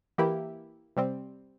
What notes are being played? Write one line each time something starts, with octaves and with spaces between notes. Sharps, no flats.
E3 A#3 E4 G4
C3 G3 C4